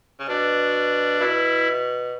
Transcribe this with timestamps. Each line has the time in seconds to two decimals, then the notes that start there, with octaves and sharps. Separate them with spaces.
0.20 C#3
0.28 B2 D4
1.20 B2 E4